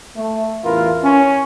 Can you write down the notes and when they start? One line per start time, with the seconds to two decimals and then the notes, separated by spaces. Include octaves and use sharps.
0.17 A3
0.64 A1 E2 E4 F4 A#4 B4
1.04 C#4